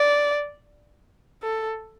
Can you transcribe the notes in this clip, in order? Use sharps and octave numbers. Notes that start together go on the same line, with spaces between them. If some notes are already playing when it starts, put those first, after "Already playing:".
Already playing: D5
A4